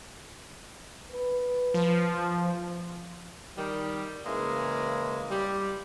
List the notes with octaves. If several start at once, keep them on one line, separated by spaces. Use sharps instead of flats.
B4
F3
D#3 G3
C#3 E3 G#3 A#3
G3